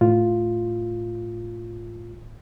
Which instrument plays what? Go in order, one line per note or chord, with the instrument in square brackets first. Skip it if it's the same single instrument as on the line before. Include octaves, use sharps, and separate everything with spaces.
[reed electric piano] A2 F4